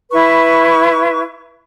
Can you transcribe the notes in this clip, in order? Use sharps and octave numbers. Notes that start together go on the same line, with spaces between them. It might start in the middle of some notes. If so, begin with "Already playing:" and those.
E4 B4 C#6